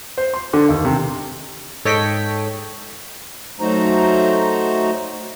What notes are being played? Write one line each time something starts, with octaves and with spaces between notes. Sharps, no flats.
C5
C6
D3
D#2
C3
G#2 A4 C#5 D#5 G5 B6
F#3 A3 D#4 F#4 C5 A#5